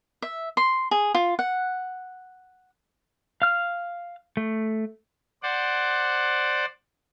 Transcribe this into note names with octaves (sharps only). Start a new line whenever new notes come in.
E5
C6
G#4
F4
F#5
F5 F6
A3
C5 D5 F#5